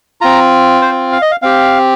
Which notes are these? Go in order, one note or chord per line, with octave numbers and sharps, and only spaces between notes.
C4 F4 A#5
C5
F5
D#5
F5
C4 G4 F5